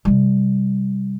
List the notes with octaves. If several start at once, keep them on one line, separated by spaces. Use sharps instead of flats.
C3 G3